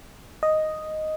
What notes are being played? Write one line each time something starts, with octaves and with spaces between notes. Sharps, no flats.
D#5